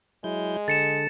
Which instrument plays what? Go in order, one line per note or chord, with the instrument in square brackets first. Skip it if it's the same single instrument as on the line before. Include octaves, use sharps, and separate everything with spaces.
[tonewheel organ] F#3 E4 G6 [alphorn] G#3
[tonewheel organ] D3 A4 [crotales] A6 C#7 E7